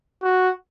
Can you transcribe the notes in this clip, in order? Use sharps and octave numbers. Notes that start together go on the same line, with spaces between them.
F#4